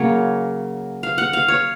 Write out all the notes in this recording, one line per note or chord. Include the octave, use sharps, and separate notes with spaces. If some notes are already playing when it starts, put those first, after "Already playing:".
Already playing: C#3 F#3 A#3 C#5
F5
F#5
F5
C#5